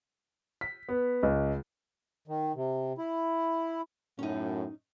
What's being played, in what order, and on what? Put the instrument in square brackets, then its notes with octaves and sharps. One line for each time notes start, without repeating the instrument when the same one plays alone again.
[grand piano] B6
B3
C#2
[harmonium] D#3
C3
E4
[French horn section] F#2 A2 [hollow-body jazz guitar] C#4 D#4